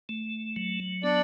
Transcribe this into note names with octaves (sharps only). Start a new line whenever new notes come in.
A3
F#3
B3 D4 D5